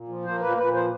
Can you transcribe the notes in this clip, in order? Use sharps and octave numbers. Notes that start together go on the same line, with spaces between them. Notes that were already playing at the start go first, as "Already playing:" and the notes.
Already playing: A#2
F3
A#3 C5
A#2 B4
A#2 B4
F3 C5